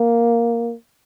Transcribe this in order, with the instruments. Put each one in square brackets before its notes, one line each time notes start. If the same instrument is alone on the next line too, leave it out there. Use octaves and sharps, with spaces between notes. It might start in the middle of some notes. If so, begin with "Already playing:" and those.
Already playing: [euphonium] A#3